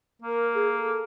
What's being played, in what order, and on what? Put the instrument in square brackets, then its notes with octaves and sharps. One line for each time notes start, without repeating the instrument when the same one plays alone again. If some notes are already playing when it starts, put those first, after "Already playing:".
[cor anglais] A#3 [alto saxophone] A#4
[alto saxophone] G#4
A4